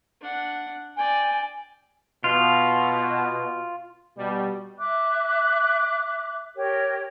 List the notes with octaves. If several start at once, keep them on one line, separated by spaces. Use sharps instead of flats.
D4 F#5
D5 G5 G#5
B2 F4
B2 G3
E5 D6 F#6
G4 A#4 C#5